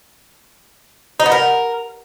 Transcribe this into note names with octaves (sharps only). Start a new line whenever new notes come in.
D#4
B3
A#4